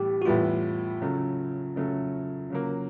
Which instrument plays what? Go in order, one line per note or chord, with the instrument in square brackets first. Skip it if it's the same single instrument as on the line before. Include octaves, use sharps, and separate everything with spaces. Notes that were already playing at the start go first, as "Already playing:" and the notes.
Already playing: [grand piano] A2 E3 G3 B3 [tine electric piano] G4
[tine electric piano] F#4
[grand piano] A2 E3 G3 B3 [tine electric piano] F4
[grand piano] C#3 F#3 A3
C#3 F#3 A3
C#3 F#3 A#3